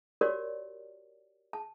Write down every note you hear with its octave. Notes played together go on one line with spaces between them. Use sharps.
F#4 G4 A#4 C#5 D5
A5